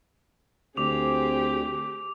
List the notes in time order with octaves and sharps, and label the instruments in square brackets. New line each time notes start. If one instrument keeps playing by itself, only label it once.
[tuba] D2 [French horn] C4 [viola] G4 G#4 [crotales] D6 F7